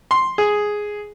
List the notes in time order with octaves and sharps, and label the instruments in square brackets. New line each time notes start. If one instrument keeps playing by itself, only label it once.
[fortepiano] C6
G#4